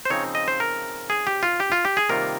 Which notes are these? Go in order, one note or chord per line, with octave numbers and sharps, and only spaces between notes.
C5
C#3 F3 C4 D#4 C#5
D#5
C5
A#4
G#4
G4
F4
G4
F4
G4
G#4
C3 D#3 G3 A#3 F4 A#4